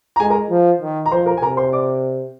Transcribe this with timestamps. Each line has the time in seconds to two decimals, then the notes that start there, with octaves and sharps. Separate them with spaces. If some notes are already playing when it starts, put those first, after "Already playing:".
0.16 A#5
0.20 G#3 G#4 G#5
0.30 A#4 A#5
0.50 F3
0.81 D#3
1.06 A#5
1.11 F3 C5 C6
1.26 A#4 A#5
1.37 G#5
1.41 C3 A#4 A#5
1.57 C5 C6
1.73 D5 D6